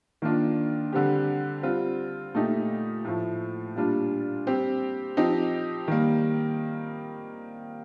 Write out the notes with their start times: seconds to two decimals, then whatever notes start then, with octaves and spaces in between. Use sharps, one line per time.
0.22 D#3 A#3 D4 F4
0.93 D3 G3 C4 G4
1.63 G3 C4 F4
2.34 A#2 A3 D#4 G4
3.05 A2 F3 A3
3.76 A#2 G3 D4 F4
4.47 G3 C4 G4
5.17 F3 C4 D#4 G4
5.88 D#3 G3 A#3